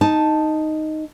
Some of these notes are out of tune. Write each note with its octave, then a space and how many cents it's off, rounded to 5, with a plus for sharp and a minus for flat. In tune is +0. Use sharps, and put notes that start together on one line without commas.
D#4 +0 A5 +0